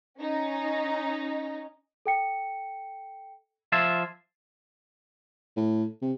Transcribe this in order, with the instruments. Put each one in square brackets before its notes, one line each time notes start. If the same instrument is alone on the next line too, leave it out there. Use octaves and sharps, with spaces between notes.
[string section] C#4 D#4
[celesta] A4 G5 C#7
[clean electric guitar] F3 F4 E5 [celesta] G#6 A6 C7
[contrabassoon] A2
C3